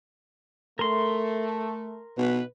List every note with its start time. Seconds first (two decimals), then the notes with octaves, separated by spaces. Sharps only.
0.79 A3 A#4 C6
2.18 B2 B4